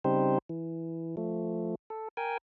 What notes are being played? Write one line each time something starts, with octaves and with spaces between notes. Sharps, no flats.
C#3 G3 C4 D#4 G4 C5
E3
F3 A3
A4
A#4 G5 G#5